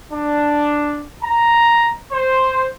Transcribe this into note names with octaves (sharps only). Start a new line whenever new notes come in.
D4
A#5
C5